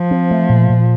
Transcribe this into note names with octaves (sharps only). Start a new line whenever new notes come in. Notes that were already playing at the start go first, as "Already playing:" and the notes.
Already playing: F3
C4
A3
A#2
A#2